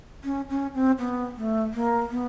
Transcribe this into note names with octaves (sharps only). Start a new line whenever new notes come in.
C#4
C#4
C4
B3
A3
A#3
B3